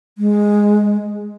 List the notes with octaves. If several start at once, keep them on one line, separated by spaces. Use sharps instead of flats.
G#3